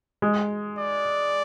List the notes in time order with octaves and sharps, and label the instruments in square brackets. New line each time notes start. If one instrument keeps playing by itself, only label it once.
[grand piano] G#3
[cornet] D5